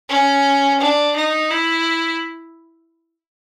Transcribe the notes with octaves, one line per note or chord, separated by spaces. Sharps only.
C#4
D4
D#4
E4